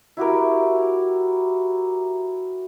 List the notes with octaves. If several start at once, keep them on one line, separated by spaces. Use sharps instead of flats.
E4 F#4 G4 A#4